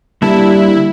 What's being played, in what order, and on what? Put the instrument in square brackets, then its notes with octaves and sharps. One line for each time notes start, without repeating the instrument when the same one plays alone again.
[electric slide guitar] D3 A#3 A5 [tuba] G3 [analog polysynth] E4